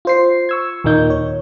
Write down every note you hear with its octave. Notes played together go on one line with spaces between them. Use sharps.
F4 C5 C7
C#6 E6 G#6
D#2 A#2 A#3 D#4 G6
C#5